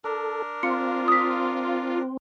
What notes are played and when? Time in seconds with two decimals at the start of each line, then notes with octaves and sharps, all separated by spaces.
0.04 D4 A4 A#4
0.63 C4 F4 C#7
1.08 D#6 B6